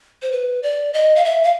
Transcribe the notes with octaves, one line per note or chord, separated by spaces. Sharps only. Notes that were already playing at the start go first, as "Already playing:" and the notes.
C5
B4
D5
D#5
F5
E5
F5